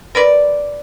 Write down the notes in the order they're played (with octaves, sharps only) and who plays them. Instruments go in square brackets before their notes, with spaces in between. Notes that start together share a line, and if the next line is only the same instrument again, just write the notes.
[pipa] A#4 B4 D5